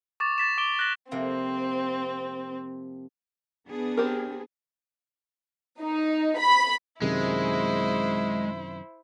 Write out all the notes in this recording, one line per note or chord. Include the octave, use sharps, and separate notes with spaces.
C#6 D6 A6 E7
A6 B6 E7
C#6 D6 D7 G7
F#6 A6 A#6 F#7
F2 C3 A#3 C4
B3 D4 G#4
C4 G4 A#4
D#4
B5
F#2 C3 D#3 G#3 E4 C5